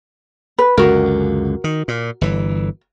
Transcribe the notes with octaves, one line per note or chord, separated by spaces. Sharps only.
B4
C#2 F#2 D3 F#4 A#4
D#3
A#2
G1 E3